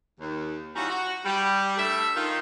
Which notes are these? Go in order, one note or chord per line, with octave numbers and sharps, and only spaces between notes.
D#2
E3 G3 C#4 D#4 F4 F#4
F#4
G3
G3 A3 D4 E5
D#3 F4